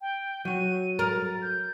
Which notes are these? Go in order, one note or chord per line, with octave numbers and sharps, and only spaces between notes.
G5
F#3 F#4 D#7
A#4 A6
G6